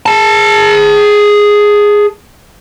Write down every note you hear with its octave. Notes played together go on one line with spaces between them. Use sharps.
G#4 A5